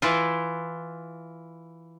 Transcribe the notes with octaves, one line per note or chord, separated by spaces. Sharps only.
E3 E4 F4